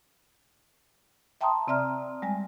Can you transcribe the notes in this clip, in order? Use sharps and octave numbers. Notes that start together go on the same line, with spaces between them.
E5 G5 A5 A#5 C6 D#6
C3 C4 D5 E5 A#5 F6
G3 G#3 G#5